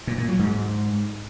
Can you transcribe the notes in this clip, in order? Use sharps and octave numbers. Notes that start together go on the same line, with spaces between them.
A#2
A#2
F#3
G#2